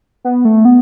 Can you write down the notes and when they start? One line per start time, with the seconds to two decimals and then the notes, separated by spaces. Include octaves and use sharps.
0.25 B3
0.45 A3
0.65 B3